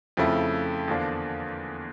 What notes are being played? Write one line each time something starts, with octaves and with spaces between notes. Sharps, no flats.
F2 C#3 F3 A3 E4
E2 D3 F3 A#3 D4